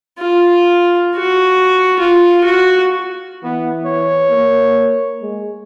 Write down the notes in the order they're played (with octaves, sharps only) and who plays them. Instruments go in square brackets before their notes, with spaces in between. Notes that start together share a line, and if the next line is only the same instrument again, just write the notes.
[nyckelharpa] F4
F#4
F4
F#4
[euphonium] E3 [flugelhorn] B3
[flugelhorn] C#5
[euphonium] A#3
G#3